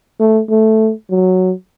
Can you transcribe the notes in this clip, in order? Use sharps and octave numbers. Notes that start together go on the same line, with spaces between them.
A3
A3
F#3